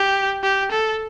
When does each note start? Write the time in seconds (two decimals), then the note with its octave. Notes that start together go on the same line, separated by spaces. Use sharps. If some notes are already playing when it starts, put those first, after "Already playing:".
Already playing: G4
0.43 G4
0.72 A4